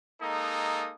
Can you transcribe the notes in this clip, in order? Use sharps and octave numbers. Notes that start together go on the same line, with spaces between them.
G#3 A#3 D#4 A4 D#6